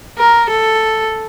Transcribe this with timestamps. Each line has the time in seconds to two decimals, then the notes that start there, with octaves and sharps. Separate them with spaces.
0.18 A#4
0.49 A4